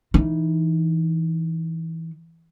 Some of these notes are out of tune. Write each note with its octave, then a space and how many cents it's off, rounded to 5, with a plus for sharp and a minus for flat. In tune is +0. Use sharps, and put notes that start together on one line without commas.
E3 -10 D#4 +0